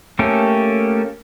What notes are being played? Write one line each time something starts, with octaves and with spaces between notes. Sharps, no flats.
A3 A#3 C#4 G4 A4